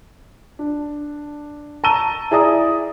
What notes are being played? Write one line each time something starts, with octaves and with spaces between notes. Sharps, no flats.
D4
A5 A#5 C#6 E6 D#7 G7
E4 G#4 D5 A#5 D#6